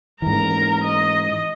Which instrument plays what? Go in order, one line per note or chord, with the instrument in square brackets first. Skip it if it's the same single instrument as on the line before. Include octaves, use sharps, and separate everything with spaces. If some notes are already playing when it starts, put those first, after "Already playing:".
[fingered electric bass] G#2 E3 [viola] A#4 A#5
[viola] D#5